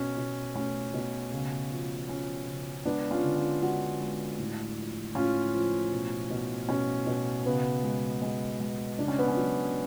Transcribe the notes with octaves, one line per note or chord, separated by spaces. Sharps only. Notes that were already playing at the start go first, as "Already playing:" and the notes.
Already playing: B2 C#4
B2
A3 C#4
B2
C#3
F3
F3 C#4
C#3
G#3 B3 D4
C#4 F4
D3
C#4 F4
G#3 D4 F#4
G#3
A2
F3
A2 C#4 F4
F3
B2
B2
B2 C#4
B2
C#3 B3
G#3
G#3
G#3
C#3 D4
C#4
B3
C#4
F#3